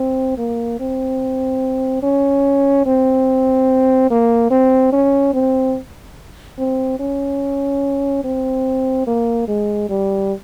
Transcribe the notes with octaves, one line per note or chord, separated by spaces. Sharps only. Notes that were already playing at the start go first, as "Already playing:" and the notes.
Already playing: C4
A#3
C4
C#4
C4
A#3
C4
C#4
C4
C4
C#4
C4
A#3
G#3
G3